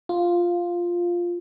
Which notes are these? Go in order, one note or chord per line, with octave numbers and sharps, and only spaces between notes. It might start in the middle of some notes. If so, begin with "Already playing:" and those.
F4